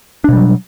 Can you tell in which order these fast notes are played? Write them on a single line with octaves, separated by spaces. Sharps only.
D4 B2 G3 F#3